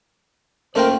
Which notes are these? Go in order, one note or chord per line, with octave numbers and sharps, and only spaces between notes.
A3 A#3 C#4 F4 A#4 C5 D5 G5